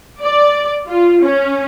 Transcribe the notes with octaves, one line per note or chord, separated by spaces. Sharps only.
D5
F4
C#4